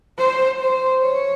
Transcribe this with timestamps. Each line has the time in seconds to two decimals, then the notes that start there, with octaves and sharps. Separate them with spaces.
0.18 C5
0.60 C5
1.02 C#5